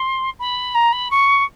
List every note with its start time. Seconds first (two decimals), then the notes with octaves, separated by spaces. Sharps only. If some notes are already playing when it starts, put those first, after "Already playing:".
Already playing: C6
0.39 B5
0.75 A#5
0.92 B5
1.11 C#6